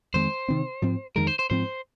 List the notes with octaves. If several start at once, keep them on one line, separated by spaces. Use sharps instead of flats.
F2 D#3 G#3 C4 C5
C3 D#3 C4
G#2 F3 C4
F2 D#3 G#3 A#4
C5
C5
G#2 F3 C4 C5